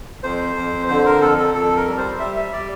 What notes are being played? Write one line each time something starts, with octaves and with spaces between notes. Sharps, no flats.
F2 C5
F2
D3 C5
A#4
F2 A4
A4
F2 A4
A#4
G3
C5
G3 E5
E5
G3 D5